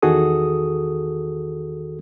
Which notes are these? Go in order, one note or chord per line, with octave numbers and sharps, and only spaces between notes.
E2 D#3 F#4 G#4 A4 D#6